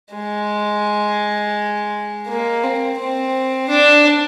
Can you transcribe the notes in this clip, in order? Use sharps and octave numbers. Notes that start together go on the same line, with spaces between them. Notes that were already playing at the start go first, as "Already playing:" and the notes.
G#3
A#3
C4
C4
D4